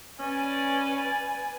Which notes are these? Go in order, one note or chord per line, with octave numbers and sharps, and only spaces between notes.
C#4 B4 D5 G#5